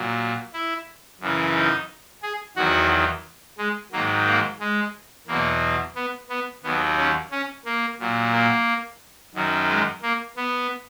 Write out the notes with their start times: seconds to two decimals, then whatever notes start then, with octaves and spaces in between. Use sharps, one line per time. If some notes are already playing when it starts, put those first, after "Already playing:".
Already playing: A#2 F#3
0.53 E4
1.21 F#2 C#3 E3
1.55 D#4
2.23 G#4
2.56 E2 D#3 F#3 F#4
3.58 G#3
3.92 G#2 D#3 F#3 A#3
4.26 A#3
4.60 G#3
5.28 E2 B2 F#3 A#3
5.96 B3
6.30 B3
6.64 D#2 D#3 F#3 B3
6.97 C#4
7.31 C#4
7.65 A#3
7.99 A#2 F#3
8.33 A#3
9.35 F#2 D#3 F#3
9.69 G#3
10.02 A#3
10.37 B3